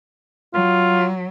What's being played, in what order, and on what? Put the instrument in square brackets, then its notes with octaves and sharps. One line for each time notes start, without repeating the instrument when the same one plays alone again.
[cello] F#3 [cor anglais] F4